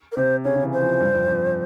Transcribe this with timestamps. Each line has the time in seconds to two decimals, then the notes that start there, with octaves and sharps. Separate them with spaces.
0.12 A#4
0.17 C3 C5
0.44 C#3 C#5
0.56 C#3
0.63 E3
0.73 C5
0.82 F3
1.00 G2
1.15 F2
1.28 F2